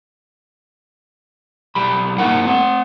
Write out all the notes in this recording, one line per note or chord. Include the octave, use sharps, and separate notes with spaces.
B1 G3 B5
G2 A#3 C4 D#4 A#4 F#5
C4 F#5